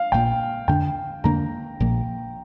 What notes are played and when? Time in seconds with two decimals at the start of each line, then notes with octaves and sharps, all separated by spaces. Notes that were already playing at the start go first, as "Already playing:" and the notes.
Already playing: F5
0.12 A#1 A#2 A#3 G5
0.68 F2 D3 A#3 D4 G5
1.24 F2 D3 A#3 D4 A#5
1.80 A#1 A#2 F3 A#3